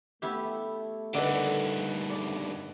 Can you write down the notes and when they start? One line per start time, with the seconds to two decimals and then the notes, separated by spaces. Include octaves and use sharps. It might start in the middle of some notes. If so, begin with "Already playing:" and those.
0.22 A3 B3 E4 G4
1.14 G2 D3 D#3 B4 D5 D#5 F#5
2.10 D5